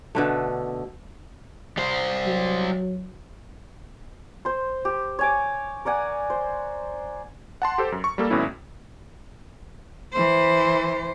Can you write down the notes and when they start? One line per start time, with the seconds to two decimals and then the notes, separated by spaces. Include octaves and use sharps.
0.15 B2 D3 A3
1.78 G3 C5
2.26 F#3
4.45 C5 C6
4.85 G4
5.19 C#5 G#5 D6
5.85 A#4 D5 F#5 G#5
6.30 C5
7.62 F#5 A5 C6
7.78 G4 A4 C5
7.92 F#2
8.04 C#6
8.18 G3 A#3 A4
8.30 G#1 A2 F#3 B3 C#4 E4
10.13 E3 C5